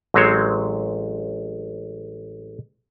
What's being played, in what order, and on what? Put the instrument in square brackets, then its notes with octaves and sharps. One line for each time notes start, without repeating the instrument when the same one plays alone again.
[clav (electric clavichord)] A1 F#3 G#3 C4 C5 C#5